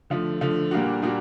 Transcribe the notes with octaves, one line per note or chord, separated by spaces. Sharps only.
D3 F3 A3
D3 F3 A3
A#2 G3 A#3 D4 F#4
A#2 G3 A#3 D4 F#4